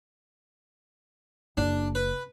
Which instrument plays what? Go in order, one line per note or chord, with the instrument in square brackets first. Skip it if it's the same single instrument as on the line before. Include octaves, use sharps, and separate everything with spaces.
[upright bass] F#1 [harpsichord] D4
[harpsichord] B4